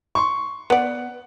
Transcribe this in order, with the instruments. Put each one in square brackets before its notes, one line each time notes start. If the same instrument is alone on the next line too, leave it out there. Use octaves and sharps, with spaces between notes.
[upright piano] C6 C#6
[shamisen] B3 D5 [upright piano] F#5